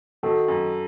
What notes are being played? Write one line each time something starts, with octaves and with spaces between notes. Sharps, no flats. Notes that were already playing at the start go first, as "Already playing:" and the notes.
D#3 F#4 A4
F#2